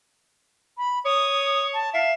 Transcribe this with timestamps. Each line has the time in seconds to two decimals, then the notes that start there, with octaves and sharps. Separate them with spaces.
0.78 B5
1.05 C#5 D#6
1.74 A5
1.94 E5 F5